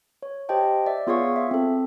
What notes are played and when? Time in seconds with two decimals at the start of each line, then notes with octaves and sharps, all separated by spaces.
0.23 C#5
0.49 G4 C5 D#5 G5 A5
0.86 D5 E5
1.07 B3 F4 G#4 C#5 F5 C#6
1.36 E5
1.51 C4 A4